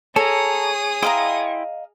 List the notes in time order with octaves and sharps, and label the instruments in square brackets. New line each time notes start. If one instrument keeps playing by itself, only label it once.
[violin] G#4 D#6 [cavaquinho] A4 [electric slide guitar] C#5 [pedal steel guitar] A5 A#5
[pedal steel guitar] E4 G5 C6 [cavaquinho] D#5 F5 A#5